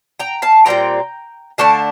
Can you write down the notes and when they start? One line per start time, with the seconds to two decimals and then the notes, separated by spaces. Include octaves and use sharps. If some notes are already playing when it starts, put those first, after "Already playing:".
0.20 G5 A#5
0.42 F5 A5
0.66 A#2 G3 C4 G5 A#5
1.58 D3 A3 D4 F5 A5